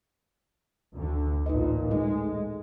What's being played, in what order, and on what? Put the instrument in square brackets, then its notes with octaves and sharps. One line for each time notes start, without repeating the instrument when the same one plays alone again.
[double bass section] D2 D3
[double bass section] A1 A#2 [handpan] D#4 B4 D#5
[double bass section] G#3 [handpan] A3 D#4 G#4